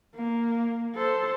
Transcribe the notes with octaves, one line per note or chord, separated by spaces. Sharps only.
A#3
A4 C5